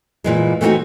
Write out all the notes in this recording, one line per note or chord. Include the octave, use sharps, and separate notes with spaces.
A#2 E3 G#3
E3 A3 C4 C#4 D#4 F#4